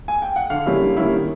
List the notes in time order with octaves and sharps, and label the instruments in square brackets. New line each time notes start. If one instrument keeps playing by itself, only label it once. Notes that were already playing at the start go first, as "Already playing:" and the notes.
[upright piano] G#5
G5
F#5
D3 F5
G3 A#3 C#4 E4
D3
G3 A#3 C#4 E4
D#3